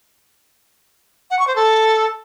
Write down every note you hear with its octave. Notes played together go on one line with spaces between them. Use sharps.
F#5
C#6
C5
A4